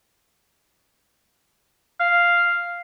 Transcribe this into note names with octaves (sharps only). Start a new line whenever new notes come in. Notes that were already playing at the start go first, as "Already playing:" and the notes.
F5